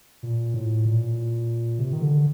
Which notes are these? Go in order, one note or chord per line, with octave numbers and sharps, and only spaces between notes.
A#2
A2
A#2
C3
D#3
D3